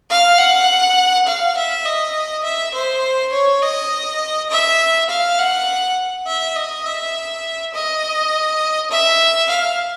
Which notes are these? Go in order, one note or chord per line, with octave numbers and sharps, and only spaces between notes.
F5
F#5
F5
E5
D#5
E5
C5
C#5
D#5
E5
F5
F#5
E5
D#5
E5
D#5
E5
F5